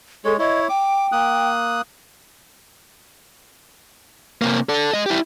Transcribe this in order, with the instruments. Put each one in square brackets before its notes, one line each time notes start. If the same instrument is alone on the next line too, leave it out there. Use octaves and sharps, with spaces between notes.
[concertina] G#3 C#5 [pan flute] A4
[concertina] E4 C#5 [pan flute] D#5
[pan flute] G5 [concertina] D6
[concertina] A#3 D#6 F#6
[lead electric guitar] C3 A#3
A4 D5
G#3 D#5
E4 G4